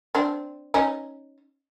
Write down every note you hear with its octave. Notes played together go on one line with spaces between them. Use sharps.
C4 D4
C#4 D#4